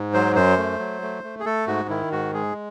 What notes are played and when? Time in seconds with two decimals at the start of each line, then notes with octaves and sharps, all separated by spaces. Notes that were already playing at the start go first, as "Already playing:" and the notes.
Already playing: G#2
0.14 F#3 C5
0.36 F#2 C5
0.58 A3
0.79 F#3
1.02 A3
1.24 A3
1.40 G#4
1.45 A3 A4
1.67 G#2 F#4
1.89 D#3 E4
2.12 G#2 F#4
2.34 G#3 G#4